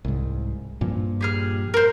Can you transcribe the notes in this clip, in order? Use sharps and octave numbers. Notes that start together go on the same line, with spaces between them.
C2 G#2
G2 A#2 F3
G4 G#4 F6
A#4 C5